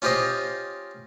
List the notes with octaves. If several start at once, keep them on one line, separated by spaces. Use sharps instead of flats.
C#4 F4 G4 C5 D#5